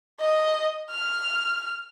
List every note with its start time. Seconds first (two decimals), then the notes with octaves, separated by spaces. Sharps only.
0.20 D#5
0.90 F6